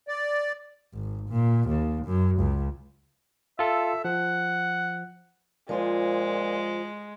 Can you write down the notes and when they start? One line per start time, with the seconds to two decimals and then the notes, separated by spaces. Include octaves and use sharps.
0.08 D5
0.94 G#1
1.29 A#2
1.68 D#2
2.06 F#2
2.39 C#2
3.59 F4 A4 E5
4.05 F3 F#5
5.69 A#2 F3 G#3 F4 C5